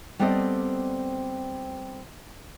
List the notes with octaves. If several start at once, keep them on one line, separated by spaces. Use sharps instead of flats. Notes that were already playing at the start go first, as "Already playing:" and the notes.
G3 B3 C4 A4 D5 D#5